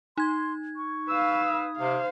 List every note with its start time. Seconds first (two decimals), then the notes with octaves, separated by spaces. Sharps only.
0.18 D#4 C6 G#6
0.77 C#6
1.09 B4 F5 E6
1.45 D#6
1.78 C3 C5 F5